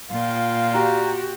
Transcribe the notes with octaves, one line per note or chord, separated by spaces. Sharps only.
A#2 F4 F5 G5
F#4 G4 D5 A#5